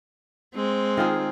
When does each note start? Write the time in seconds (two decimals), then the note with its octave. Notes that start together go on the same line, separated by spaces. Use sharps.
0.55 G#3 C4
0.97 D#3 F4 G#4